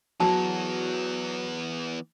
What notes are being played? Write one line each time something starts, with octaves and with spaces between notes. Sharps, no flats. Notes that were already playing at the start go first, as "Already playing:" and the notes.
E3 F#3 B3 A5